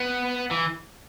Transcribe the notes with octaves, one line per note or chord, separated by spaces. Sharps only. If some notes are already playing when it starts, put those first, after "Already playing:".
Already playing: B3
E3